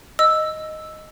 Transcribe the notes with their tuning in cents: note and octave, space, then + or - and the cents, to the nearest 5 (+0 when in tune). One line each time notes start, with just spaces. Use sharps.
D#5 +0 E6 +0